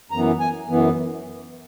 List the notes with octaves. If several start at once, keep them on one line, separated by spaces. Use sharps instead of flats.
F#2 E3 B3 A#5
G#5
F#2 E3 B3